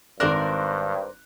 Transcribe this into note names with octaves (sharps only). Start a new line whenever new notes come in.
G#1 G2 A#4 C5 D5 F#6